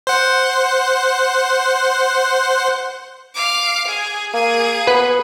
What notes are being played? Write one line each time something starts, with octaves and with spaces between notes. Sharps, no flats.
C5 F#5
F5 D6
G#4
A#3 G#4
B3 B4